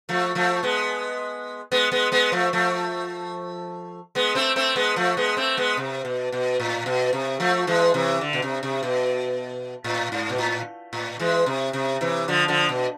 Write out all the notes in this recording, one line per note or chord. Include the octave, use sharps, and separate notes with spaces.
F3 A3
F3 A3
G#3 B3
G#3 B3
G#3 B3
G#3 B3
F3 A3
F3 A3
G#3 B3
A3 C4
A3 C4
G#3 B3
F3 A3
G#3 B3
A3 C4
G#3 B3
C3
B2
B2
A2
B2
C3
F3 A3
E3 G#3
C3 E3
D3
B2
C3
C3
B2
A2
G#2
B2
A2
A2
E3 G#3
C3
C3
C3 E3
D3 F3
D3 F3
B2